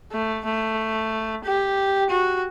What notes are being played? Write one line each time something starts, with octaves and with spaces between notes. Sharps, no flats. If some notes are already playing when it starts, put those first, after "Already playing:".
A3
A3
G4
F#4